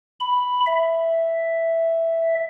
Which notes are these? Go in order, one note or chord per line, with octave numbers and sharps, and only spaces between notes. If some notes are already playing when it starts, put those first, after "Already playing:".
B5
E5